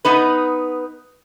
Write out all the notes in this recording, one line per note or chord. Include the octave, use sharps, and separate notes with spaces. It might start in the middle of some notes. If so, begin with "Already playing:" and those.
B3 D#4 B4